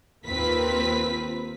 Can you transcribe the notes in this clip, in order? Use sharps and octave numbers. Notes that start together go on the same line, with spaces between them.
D#2 A#3 C4 F4 B4 B6